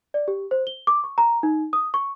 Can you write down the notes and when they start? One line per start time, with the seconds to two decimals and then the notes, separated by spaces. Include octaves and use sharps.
0.14 D5
0.28 G4
0.51 C5
0.67 G7
0.87 D6
1.04 C#6
1.18 A#5
1.43 D#4
1.73 D#6
1.94 C#6